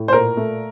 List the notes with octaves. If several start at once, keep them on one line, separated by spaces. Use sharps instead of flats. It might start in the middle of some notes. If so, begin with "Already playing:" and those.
Already playing: A2
C5
A#2 A#4
A3